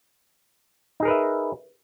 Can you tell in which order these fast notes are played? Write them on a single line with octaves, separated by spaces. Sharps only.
D#4 G#4 A#4 B4 E5